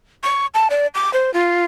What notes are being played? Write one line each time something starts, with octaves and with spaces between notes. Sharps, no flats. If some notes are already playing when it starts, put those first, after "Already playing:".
C#6
A5
D5
D6
C5
F4